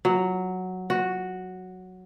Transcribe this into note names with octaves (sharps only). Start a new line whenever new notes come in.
F#3
F#4